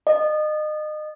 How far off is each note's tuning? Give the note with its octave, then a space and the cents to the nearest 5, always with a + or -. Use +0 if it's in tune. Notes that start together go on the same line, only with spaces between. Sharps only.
D#5 -30